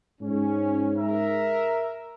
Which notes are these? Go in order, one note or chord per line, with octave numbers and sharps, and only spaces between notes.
G#2 C#4
A#4 E5